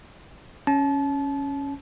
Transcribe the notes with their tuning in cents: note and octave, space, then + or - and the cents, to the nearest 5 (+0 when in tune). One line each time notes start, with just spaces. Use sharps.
C#4 +0 A5 -30